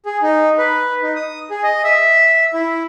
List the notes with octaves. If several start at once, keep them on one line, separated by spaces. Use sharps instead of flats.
G#4
D#4
B4
D#4
D#6
G#4
D#5
E5
E4